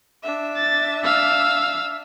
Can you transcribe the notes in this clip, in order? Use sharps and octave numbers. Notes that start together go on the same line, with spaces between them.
D4 E5
A6
F5 E6